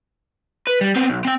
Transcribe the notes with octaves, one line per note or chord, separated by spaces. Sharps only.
B4
G3
B3 C4
B1
C4 G5